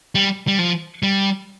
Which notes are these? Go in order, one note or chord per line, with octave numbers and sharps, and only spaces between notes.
G3
G3
F3
G3